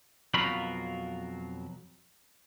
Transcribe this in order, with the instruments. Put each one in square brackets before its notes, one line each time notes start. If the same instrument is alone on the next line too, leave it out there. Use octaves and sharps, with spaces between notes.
[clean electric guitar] F2 B2 F#3 F4 A#4 B5